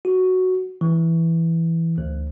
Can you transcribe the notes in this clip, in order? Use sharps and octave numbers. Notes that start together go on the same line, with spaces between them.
F#4
E3
D2